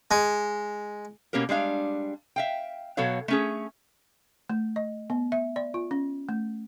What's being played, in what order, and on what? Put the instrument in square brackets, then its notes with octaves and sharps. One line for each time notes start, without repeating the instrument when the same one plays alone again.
[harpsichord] G#3
[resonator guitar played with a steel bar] B2 A#3 C#4 G4 A#4
G3 G#3 D4 F5
E5 F5 G5
B2 F#3 A4 C#5 F5
A3 C#4 G#4
[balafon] A3
D#5
B3
E5
D5
F4
C#4
A3